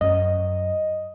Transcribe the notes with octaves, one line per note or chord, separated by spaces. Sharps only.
F#2 D#5